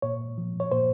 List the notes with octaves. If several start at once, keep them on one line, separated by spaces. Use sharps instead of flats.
A#2 C#5
F3
C#5
A#2 C5